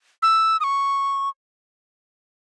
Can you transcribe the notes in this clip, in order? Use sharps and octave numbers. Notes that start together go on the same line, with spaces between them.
E6
D#6
C#6